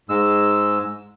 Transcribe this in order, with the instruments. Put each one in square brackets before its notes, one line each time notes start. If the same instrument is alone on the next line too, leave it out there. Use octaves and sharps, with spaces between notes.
[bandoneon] G#2 G#3 E6